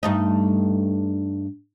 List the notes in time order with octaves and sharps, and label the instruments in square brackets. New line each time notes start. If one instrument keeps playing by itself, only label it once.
[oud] G2 A3 D#4